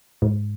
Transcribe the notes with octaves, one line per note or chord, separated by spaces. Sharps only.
G#2